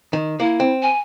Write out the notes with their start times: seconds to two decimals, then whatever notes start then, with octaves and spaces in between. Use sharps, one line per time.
0.13 D#3
0.40 A#3 E4
0.60 C4
0.82 G#5